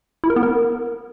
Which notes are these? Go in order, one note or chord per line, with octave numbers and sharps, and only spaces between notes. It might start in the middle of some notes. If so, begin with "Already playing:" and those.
E4
A#4
B3
A#4